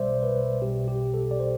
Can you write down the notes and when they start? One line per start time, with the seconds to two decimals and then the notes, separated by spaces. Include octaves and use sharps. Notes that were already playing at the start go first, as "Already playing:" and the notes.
Already playing: B1 B2 G3 C5 D5 E5
0.23 B4
0.61 B1 B2 G3 G4
0.88 G4
1.14 A4
1.31 D5
1.40 C5